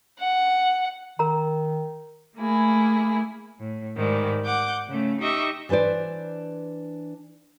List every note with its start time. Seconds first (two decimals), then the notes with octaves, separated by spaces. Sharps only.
0.20 F#5
1.19 D#3 A#4 A#5
2.37 A3 A#3 E4 G#4
3.58 A2
3.96 G#2 D#3 G3
4.44 F#5 D6 G6
4.87 C#3 A3
5.20 D#4 G4 D#5 E5 C#6
5.69 E3 D4 B4 C5 D5